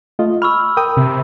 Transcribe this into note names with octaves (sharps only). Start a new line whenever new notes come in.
A3 F4 D#5
B5 C#6 E6 F6
A#4 G5 D#6
C3